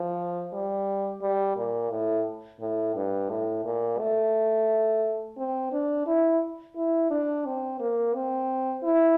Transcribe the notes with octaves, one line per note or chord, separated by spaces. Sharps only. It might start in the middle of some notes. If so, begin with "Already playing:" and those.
Already playing: F3
G3
G3
A#2
A2
A2
G2
A2
A#2
A3
C4
D4
E4
E4
D4
C4
A#3
C4
E4